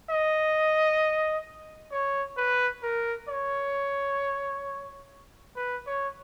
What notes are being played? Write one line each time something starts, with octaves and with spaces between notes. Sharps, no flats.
D#5
C#5
B4
A#4
C#5
B4
C#5